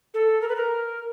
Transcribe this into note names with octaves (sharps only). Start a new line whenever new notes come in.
A4
A#4
B4
A#4